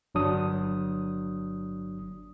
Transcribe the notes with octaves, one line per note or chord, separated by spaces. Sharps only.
G1 F#3 D4 D#6